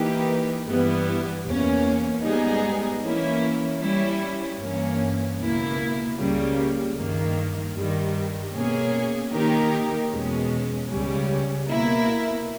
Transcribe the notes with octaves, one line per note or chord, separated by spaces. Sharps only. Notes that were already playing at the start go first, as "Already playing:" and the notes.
Already playing: E3 A#3 D#4 G4 B4
G2 E3 G3 B3 E4
E2 B2 A#3 C#4
G#2 G3 B3 D#4 G#4
E3 A#3 C#4 E4
G3 C#4 E4
G2 E3 A#3 C#4
C#2 B2 A#3 E4
C#2 C#3 G3 A#3
G2 D#3 A#3
G2 D#3 G3
B2 A#3 C#4 G#4
D#3 A#3 D#4 G4 A#4
E2 B2 G#3 C#4
C#2 C#3 G3 C#4
B2 A#3 E4 A#4